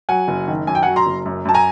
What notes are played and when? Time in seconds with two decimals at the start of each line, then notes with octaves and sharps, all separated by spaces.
0.09 F#3 F#5 G#5
0.28 F#1
0.48 D#3
0.67 F#2 G#5
0.75 G5
0.82 F#3 F#5 G#5
0.96 A#5 C6
1.06 F#1
1.26 F#2
1.45 F#2 A5
1.54 G#5 A#5